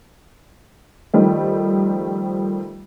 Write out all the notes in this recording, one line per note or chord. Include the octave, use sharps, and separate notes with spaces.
D#3 F3 G3 A3